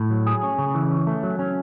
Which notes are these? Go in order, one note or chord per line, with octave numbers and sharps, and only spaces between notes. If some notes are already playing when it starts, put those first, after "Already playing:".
Already playing: A2
F#3
G#4
C#4
C#3
E3
C#4
A3
F#3
C#4